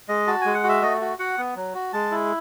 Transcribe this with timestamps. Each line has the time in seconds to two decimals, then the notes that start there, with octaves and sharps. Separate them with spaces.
0.09 G#3 D#5
0.27 F#4 A5
0.41 G#3 G#5
0.54 F#5
0.64 F#4
0.69 E5
0.82 A3 D#5
1.01 F#4
1.19 F#4 F#5
1.38 B3
1.56 F#3
1.74 F#4
1.93 G#3 A5
2.11 E4